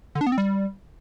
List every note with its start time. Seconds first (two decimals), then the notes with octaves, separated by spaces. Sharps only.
0.15 D3
0.21 D4
0.26 B3
0.32 C4
0.38 G3